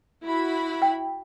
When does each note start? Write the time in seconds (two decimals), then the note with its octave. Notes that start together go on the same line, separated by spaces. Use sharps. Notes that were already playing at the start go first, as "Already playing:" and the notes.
0.24 E4 F#4 B5
0.82 G5